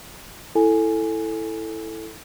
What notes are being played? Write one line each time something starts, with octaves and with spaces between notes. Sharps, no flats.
E4 A4 G#5